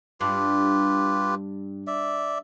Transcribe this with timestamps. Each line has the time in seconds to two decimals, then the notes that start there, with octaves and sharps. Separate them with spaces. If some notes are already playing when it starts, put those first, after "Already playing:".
0.21 G2 F4 G4 B4
1.87 D5 E5